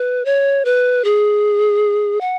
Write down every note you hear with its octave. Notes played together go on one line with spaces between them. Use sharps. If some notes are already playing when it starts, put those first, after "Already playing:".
Already playing: B4
C#5
B4
G#4
F#5